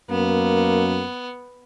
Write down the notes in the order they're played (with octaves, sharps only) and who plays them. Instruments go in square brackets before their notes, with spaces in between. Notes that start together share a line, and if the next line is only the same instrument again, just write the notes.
[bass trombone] F#2 [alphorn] A#3 [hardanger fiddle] B3